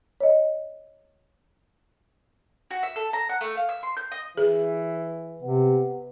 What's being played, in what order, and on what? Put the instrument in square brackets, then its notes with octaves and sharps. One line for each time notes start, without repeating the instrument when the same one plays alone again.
[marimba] C#5 D#5
[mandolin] F#4
E5
A4
A#5
F#5
A3
F5
E5
C6
G6
D#5
[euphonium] E3 [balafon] G#4
[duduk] C3 [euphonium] B3